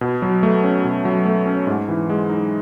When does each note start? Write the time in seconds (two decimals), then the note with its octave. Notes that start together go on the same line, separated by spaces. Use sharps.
0.01 B2
0.22 F#3
0.43 A3
0.63 C#4
0.84 B2
1.05 F#3
1.26 A3
1.47 C#4
1.67 G#2
1.89 E3
2.09 G#3
2.30 D#4